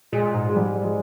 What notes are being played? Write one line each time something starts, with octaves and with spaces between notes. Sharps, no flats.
A#2 G#3
G#2
G#3
G3
G#3